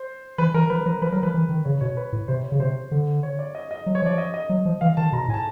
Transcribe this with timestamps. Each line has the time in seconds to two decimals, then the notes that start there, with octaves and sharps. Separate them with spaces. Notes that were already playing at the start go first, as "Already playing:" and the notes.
Already playing: C5
0.38 E3 B4
0.54 E3 A#4
0.70 F3 B4
0.86 F3 A#4
1.02 F3 B4
1.12 F#3 A#4
1.23 F3 B4
1.34 E3
1.49 D#3
1.65 C#3 C#5
1.81 B2 C#5
1.97 B4
2.13 A2
2.28 C3 C5
2.44 C#5
2.52 C#3
2.60 C3 C5
2.91 D3
3.23 C#5
3.39 D5
3.55 D#5
3.71 D#5
3.86 F#3
3.95 C#5
4.02 F3 D5
4.18 D#5
4.34 D#5
4.49 F#3
4.65 F3
4.81 E3 F5
4.97 D#3 A5
5.12 B2 A#5
5.28 A2 G#5
5.34 A5